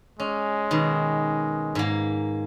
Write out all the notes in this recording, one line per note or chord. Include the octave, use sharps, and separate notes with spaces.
G#3 C#4
B2 D#3
G#2 A#3